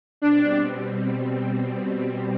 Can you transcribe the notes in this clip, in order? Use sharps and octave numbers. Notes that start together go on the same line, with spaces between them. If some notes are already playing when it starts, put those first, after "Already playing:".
B2 G3 C4 D4